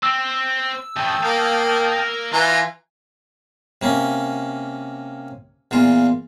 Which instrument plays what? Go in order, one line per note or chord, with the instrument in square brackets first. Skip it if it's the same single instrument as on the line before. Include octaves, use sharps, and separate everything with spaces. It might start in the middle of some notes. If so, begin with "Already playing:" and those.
[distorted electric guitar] C4 [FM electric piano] E6
[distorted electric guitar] E3 A3 [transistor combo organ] G5 A5 D#6
[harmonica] A#3 [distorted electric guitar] A#4 F5
[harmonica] E3 A#5 [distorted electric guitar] F4 [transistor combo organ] G#5
[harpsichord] C3 A#3 C#4
E2 A#2 F4